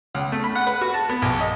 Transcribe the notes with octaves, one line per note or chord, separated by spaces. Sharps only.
C#2
A3
B5
F#5
B4
F#4
A5
B3
A#1
D#5